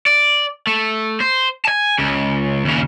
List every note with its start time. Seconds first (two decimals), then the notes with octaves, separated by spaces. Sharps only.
0.06 D5
0.67 A3
1.20 C5
1.65 G#5 A5
1.98 C#2 C#3
2.65 D#2 C#3